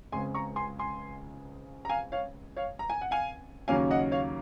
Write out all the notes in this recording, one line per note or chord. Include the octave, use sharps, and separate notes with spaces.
C#2 C#3 G#3 C4 G#5 C6
A#5 C#6
G#5 C6
G#5 C6
A#5
F5 G#5
C#5 F5
C#5 F5
A#5
G#5
F#5
F5 G#5
D#2 C#3 F#3 A#3 C#4 F5 G#5
D#5 F#5
C#5 F5